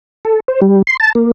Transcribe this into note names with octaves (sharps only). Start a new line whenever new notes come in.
A4
C5
G3
C6
A5
A#3